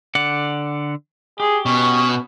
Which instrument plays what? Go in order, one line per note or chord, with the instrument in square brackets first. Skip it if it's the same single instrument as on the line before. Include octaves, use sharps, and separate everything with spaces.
[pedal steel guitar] D3 D5 F#5
[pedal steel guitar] G4 [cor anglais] G#4
[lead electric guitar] B2 [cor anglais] C#4